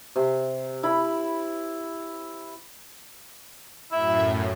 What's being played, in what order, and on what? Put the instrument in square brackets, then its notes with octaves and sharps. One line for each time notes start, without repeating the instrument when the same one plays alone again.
[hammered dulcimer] C3
E4 B5
[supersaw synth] F#2 A2 [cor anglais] E4 [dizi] E5